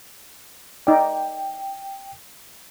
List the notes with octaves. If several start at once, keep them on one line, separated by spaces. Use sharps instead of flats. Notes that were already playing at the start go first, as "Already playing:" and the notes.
D#4 D5 G5